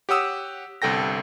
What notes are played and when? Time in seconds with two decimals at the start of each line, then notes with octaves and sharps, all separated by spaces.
0.09 G4 C#5 F#5 D#6 E6
0.82 G1 C2 A4 G5 A#6